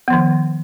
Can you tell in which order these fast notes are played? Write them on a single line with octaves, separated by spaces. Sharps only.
B3 F3 D#3